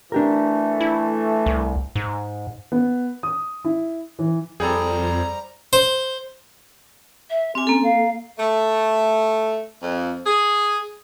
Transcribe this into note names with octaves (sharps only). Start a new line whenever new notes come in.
E3 A3 D4 G4 A#4
E4
C2
G#2
B3
D#6
E4
E3
F2 G3 G#4 A4 C5 G5 A#5
C5
E5
C4 G4 G#5
A#3 C#4 A4
F5
A3
F2
G#4